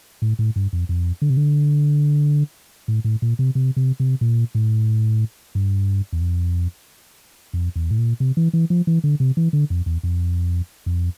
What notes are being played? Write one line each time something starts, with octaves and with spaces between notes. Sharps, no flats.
A2
A2
G2
F2
F2
D3
C3
D3
A2
A2
A#2
C3
C3
C3
C3
A#2
A2
G2
E2
F2
F2
E2
A2
A#2
C3
E3
E3
F3
E3
D3
C3
E3
D3
F2
E2
F2
F2